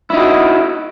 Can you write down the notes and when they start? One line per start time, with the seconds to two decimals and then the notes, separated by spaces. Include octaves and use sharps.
0.10 E4
0.13 D#4
0.16 F#4